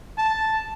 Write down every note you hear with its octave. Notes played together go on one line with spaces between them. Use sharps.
A5